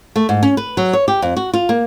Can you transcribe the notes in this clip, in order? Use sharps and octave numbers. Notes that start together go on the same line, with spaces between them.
A3
G#2
C#4
B4
F#3
C#5
G4
F2
F#4
F4
A#3